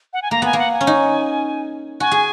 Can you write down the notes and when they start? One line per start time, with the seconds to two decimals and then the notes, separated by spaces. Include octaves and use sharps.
0.13 F#5
0.22 G#5
0.31 A#3 A#5
0.42 B3 G#5
0.53 A#3
0.59 F#5
0.73 G#5
0.81 C#4
0.87 D#4
2.00 F#4 G#5
2.11 G#4